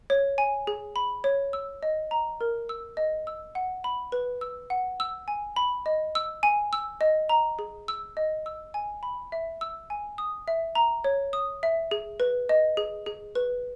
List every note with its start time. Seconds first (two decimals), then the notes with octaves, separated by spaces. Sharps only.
0.10 C#5
0.38 G#5
0.67 G#4
0.96 B5
1.24 C#5
1.53 E6
1.83 D#5
2.11 A#5
2.41 A#4
2.69 E6
2.97 D#5
3.27 E6
3.55 F#5
3.84 B5
4.12 B4
4.41 E6
4.70 F#5
5.00 E6
5.28 G#5
5.56 B5
5.86 D#5
6.15 E6
6.43 G#5
6.73 E6
7.01 D#5
7.29 A#5
7.59 G#4
7.88 E6
8.17 D#5
8.46 E6
8.74 G#5
9.03 B5
9.32 E5
9.61 E6
9.90 G#5
10.18 D#6
10.48 E5
10.75 A#5
11.04 C#5
11.33 D#6
11.63 E5
11.91 G#4
12.20 B4
12.49 D#5
12.77 G#4
13.06 G#4
13.35 B4